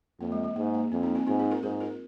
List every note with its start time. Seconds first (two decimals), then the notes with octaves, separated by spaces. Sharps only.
0.20 F2 A#3
0.32 G#3
0.44 G#3
0.56 G#2 A#3
0.74 A#3
0.91 F2 C4
1.03 A#3 D#4
1.15 C4 F4
1.27 G#2 C4 F4
1.39 D#4 G#4
1.51 F4 A#4
1.63 G#2 G#4 C5
1.80 F4 A#4